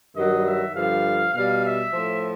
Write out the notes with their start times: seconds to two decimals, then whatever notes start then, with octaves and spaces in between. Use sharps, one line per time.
0.15 G2 D#3 F#3 D#5
0.45 E5
0.75 G2 D3 F3 F5
1.33 B2 G3 F5
1.64 E5
1.93 A2 F3